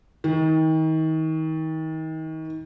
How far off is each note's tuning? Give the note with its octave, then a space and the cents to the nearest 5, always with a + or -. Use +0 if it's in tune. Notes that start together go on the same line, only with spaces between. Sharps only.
D#3 +35